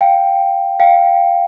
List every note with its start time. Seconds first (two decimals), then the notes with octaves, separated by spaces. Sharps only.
0.01 F5 G5
0.80 F5 G5